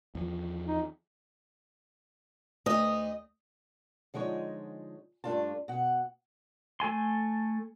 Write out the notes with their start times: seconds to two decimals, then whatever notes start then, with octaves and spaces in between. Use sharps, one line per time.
0.15 E2 F3
0.67 D#4
2.66 D2 D#5
4.14 D3 F3 G#3 D#4 C#5
5.24 G2 A3 D4 F4 A5
5.68 B2 F#5
6.80 A3 A4 G#5 C6